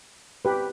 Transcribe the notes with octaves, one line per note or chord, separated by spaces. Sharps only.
G4 B4